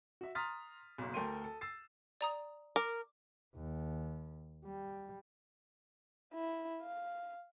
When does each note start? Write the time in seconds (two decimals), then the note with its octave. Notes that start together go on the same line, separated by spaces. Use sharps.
0.21 F#4 E5
0.35 A#5 C6 D#6 F6 A6 B6
0.98 F#1 B1
1.14 D2 A4 A#4 G5 C6 D#7
1.44 A4
1.61 E6 A6 C7
2.21 D5 A#5 D#6
2.76 A#4 D6
3.55 D#2
4.65 G3
6.34 E4
6.81 F5